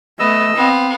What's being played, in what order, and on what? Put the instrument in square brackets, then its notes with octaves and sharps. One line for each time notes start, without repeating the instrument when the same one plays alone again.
[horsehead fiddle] A3 [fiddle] B3 [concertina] D#5 E6
[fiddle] B3 F5 [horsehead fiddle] C4